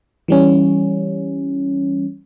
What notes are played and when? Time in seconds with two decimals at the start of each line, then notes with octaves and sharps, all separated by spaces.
0.28 E3 G3 C#4